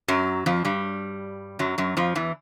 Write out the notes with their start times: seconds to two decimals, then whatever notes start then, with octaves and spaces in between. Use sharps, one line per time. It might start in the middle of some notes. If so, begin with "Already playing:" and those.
0.08 F#2 F#3
0.46 F2 F3
0.65 G2 G3
1.59 F#2 F#3
1.78 F#2 F#3
1.97 F2 F3
2.15 E2 E3